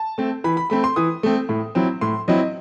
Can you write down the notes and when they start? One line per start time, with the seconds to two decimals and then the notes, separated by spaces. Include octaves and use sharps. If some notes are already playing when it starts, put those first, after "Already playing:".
Already playing: A5
0.18 A3 C4
0.44 E3 B5
0.57 B5
0.70 A3 C4 B5
0.84 C6
0.96 E3 D#6
1.23 A3 C4
1.49 A2
1.75 F#3 C4 E4
2.01 A2 C6
2.28 F#3 C4 E4 D#5